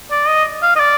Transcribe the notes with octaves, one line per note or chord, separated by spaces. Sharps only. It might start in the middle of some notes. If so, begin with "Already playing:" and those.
D5
D#5
F5
D#5
D5